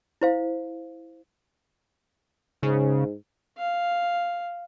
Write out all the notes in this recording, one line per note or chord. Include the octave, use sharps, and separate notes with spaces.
E4 C5 F5
G#2 C#3
F5